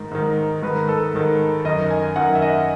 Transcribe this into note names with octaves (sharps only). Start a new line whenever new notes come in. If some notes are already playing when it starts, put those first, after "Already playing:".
Already playing: G#2 D#3
G#2 D#3
G#2 D#3 B4
A4
G#2 D#3
F#2 D#3 D#5
G#5
F#2 D#3 F#5
E5
D#5